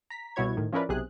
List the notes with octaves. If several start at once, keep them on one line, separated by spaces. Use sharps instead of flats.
A#5 B6
C2 B2 E4 F#4 C#5 G#6
A2 D#3
F3 C#4 E4 A#4 B4 D5
B1 C3 G#4 F#6